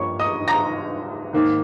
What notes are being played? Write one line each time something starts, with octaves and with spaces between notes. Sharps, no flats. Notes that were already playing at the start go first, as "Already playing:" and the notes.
Already playing: G2 F3 A#3 C#5 C#6
D#5 D#6
A#5 A#6
G#2 D#3 A#3